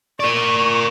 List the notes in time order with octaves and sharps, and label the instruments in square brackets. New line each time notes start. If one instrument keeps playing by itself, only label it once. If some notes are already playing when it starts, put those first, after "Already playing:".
[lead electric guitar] A#4 D5 [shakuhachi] C#6